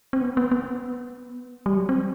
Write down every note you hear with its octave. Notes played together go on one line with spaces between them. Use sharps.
C4
B3
B3
B3
G3
F#3
C4